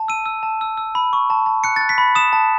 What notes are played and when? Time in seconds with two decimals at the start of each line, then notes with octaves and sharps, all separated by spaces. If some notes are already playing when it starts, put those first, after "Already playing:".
Already playing: A5
0.08 E6 D#7
0.26 E6
0.43 A5
0.61 E6
0.77 E6
0.95 B5
1.13 C#6
1.30 A5
1.46 A5
1.64 F#6 C#7
1.76 A6
1.81 F#6
1.89 B6
1.98 B5
2.15 D#6 E7
2.33 A5